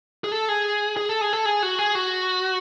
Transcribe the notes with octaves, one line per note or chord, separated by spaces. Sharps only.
G#4
A4
G#4
G#4
A4
G#4
A4
G#4
F#4
G#4
F#4